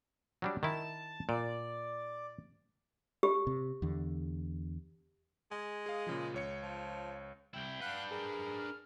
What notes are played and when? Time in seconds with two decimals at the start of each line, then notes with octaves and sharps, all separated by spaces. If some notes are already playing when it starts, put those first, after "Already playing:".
0.42 F#3 G3 D4
0.63 D#3 E4 A5
1.29 A#2 D5
3.23 G4
3.47 C3
3.82 E2 D3
5.52 G#3 G#5
5.86 G#4 F5
6.07 A#2 C#3 F3
6.34 C#2 C#5 C#7
6.63 F3
7.54 C2 E4 G5
7.81 D4 B4 F5 F#5 F#6
8.11 G#4 A#4
8.57 F6